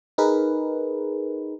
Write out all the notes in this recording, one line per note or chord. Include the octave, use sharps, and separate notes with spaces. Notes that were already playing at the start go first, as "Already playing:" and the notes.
D#4 G#4 A#4 B4